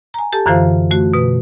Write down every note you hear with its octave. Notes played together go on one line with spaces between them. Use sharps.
G#5 A#5
G4 A4 A5
F#2 D3 E3 F4 C5 F5
A3 F#4
B2 B4